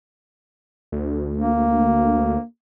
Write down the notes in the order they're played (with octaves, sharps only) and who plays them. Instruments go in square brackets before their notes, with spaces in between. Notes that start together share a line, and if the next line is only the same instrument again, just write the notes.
[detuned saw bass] D2
[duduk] A#3